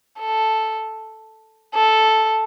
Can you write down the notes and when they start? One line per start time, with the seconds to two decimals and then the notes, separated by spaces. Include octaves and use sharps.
0.20 A4
1.75 A4